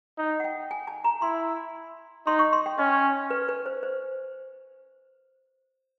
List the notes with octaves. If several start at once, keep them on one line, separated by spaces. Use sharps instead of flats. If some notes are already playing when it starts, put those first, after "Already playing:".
D#4
F#5
G5
G#5
A5
A#5
E4 C6
D#4 C6
C#6
C6
G5
C#4 D#5
B4
B4
C5
C5